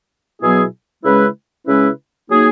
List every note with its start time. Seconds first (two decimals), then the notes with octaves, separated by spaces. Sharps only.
0.41 B2 F#3 B3 E4 G#4
1.04 C#3 G#3 C#4 E4 B4
1.65 C#3 G#3 C#4 E4 B4
2.28 F#3 A#3 D#4 G#4